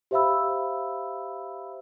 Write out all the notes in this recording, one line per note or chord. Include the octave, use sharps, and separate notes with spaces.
G4 C5 E5 F5 B5 E6